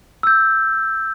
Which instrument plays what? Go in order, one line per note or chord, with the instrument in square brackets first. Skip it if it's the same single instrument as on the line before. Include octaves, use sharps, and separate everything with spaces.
[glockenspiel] E6 G6